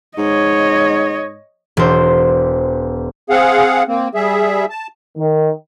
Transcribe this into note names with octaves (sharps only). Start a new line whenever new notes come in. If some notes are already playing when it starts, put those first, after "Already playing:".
G#2 C#5 D#5
E1 C5
C4 G#4 F5 F#5
A#3 C4
G3 G#4 E5
A5
D#3